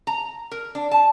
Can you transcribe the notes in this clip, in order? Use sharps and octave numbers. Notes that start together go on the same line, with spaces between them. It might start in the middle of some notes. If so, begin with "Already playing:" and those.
A#5
A#4
D4
A5